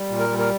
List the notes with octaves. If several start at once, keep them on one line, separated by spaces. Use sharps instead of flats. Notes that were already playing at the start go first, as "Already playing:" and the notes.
Already playing: G3
A#2
A#4
G3
A#4